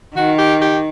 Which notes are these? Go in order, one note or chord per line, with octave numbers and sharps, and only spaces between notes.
D#3 F#4
G4
G4